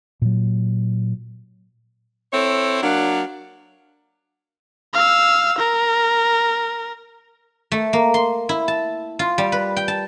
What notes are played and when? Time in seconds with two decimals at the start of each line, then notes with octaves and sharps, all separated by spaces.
0.22 A#2 F#3
2.32 C4 E4 A4 C#5
2.82 F#3 A#3 D4
4.94 F5 E6
5.58 A#4
7.72 A3
7.93 A#3
8.14 C6
8.49 E4
8.68 A5
9.19 F4
9.38 G3
9.52 B4
9.77 G5
9.88 A5